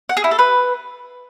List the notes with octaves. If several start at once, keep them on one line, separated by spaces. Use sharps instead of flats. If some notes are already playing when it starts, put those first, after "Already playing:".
F#5
G#4
E4
A4
B4